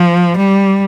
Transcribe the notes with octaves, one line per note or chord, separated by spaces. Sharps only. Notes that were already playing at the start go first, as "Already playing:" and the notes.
Already playing: F3
G3